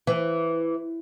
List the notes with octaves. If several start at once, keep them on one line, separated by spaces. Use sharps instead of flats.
E3